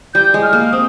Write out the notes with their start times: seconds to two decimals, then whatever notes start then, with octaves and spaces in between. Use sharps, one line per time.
0.14 G3 G6
0.34 G#3
0.43 F6
0.53 A#3
0.72 C4 D#6